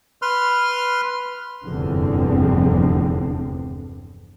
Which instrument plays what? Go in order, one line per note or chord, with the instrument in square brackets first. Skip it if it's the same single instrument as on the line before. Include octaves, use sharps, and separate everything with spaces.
[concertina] B4 C6 F6
[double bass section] F1 E2 G2 D3 C4